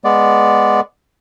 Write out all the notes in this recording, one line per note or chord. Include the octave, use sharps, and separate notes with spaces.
G#3 B3 D5